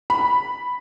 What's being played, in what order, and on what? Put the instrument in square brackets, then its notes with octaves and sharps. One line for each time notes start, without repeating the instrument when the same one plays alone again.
[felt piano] B5